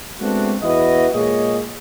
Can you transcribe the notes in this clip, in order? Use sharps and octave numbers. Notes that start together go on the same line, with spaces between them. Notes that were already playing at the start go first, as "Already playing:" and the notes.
G#3 A3 B3 C4 D4 F#4
E2 E4 F#4 B4 D#5
A#2 G#3 A#3 G#4 C#5 D#5